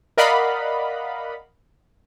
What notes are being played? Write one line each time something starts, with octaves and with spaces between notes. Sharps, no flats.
A#4 D5 D#5 F5 F#5 B5